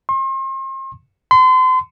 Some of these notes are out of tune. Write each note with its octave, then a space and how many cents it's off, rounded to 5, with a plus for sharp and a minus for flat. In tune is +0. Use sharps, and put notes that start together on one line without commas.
C6 +40
C6 -35